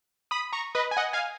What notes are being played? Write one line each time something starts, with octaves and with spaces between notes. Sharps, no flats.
B5 D#6
A#5 C#6
B4 D#5
G#5
D#5 F#5
F5 G#5